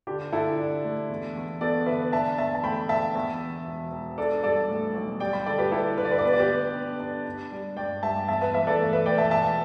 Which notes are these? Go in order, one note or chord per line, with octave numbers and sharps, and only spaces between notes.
D3 G4
D3 E4 A4
D4
A3
E2
E2
B3 A4 D5
D3 B4 E5
D4 E5 A5
E2 E5 A5
A5
A3 G5 B5
D4 E5 A5
E2
E2
E1
E1
D4 A4 D5
G3 A4 D5
A2
B1
G3 D5 G5
G5 B5
D3 A4 D5
G4 B4
D4 E4 A4
D3 B4
D5
B4
D5
B3 B4
D5
G4 B4
B3
D4
D4
D4
G3
G2 D5 G5
G2 E5 A5
E2 E5 A5
B4 E5
E3 B4 E5
A4 D5
A3
B4 E5
A3 D5 G5
E5 A5
E1 E5 A5